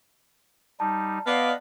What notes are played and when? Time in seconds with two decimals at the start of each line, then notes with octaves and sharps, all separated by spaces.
0.80 G3 D#4 A5
1.27 B3 D5 D#5 F5 D6